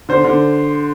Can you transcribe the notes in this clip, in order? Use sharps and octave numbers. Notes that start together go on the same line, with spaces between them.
D3 C5
D3